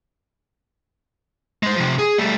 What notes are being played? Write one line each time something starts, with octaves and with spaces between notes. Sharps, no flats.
G#3 C5
C3 F3
G#4
G3 A3